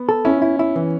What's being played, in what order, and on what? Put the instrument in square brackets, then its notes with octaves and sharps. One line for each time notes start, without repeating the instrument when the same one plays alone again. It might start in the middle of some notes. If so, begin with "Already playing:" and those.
Already playing: [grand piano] B3
[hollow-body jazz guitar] A4
[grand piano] C#4 [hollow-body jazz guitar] E4
[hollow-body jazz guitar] E4
E4
E3